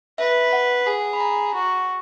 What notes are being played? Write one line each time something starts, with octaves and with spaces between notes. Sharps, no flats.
B4 E5
F#5
G#4
B5
A#5
F#4